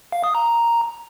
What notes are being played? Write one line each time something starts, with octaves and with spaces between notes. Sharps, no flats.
F5
D#6
A#5